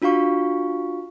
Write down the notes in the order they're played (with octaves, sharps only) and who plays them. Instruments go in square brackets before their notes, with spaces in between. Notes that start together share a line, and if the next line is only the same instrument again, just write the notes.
[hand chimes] D4 F4 F#4 F5 C#6